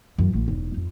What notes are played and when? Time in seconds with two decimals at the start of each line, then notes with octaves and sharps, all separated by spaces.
0.18 F#2 E3
0.35 F1 A#1
0.48 E1 D#4
0.77 F2